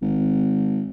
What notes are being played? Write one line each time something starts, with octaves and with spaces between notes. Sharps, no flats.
G#1